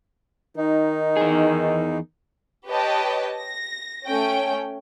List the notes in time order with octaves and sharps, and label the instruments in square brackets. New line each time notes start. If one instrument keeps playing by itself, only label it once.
[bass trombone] D#3 [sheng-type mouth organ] D#4
[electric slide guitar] E2 G#4
[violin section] G4 B4 C#5 D#5 G5 A5
A#6
A3 C#4 G5